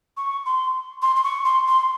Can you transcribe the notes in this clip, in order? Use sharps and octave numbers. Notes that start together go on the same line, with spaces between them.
C#6
C6
C6
C6
C#6
C6
C6